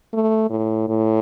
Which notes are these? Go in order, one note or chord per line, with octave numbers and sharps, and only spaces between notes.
A3
A2
A2